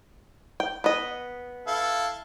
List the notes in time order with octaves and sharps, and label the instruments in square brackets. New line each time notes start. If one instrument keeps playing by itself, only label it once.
[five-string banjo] G5
B3 D#5
[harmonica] E4 A4 F5